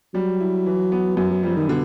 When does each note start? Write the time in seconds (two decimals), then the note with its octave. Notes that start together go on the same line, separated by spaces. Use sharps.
0.14 F#3 G3
0.40 E4
0.66 E3
0.92 B3
1.17 F#2 F#3
1.31 F#3
1.43 F3 G3
1.57 D#3
1.69 B2 D3